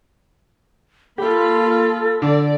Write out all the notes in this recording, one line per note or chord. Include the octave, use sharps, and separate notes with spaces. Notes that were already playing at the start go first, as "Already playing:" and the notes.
A#3 F4 G4 A4 B5
D3 D5